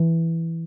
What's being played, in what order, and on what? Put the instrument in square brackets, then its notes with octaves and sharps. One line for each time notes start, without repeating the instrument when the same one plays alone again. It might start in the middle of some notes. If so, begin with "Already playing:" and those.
Already playing: [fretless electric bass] E3